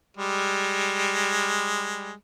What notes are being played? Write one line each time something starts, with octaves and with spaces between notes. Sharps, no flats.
G3 G#3